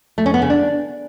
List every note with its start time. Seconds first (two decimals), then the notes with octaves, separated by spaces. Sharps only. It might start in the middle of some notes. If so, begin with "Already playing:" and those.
0.18 A3
0.26 C#4
0.34 B3
0.42 C#3
0.50 D4